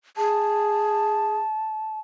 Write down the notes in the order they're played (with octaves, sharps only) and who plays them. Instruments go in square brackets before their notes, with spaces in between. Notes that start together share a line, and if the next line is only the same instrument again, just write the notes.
[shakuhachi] G#4 [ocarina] A5